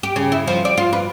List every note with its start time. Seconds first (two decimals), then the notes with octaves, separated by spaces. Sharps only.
0.03 G4
0.16 C#3
0.32 E4
0.47 F3
0.65 D5
0.78 F4
0.93 B4